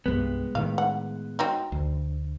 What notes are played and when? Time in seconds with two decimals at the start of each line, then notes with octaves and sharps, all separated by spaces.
0.06 C2 G2 G#3 B3
0.55 A2 D#3 F5
0.78 F#5
1.39 F#3 C4 D#4
1.72 D2